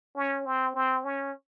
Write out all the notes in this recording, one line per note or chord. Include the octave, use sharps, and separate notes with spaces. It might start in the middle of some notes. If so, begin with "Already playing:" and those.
C#4
C4
C4
C#4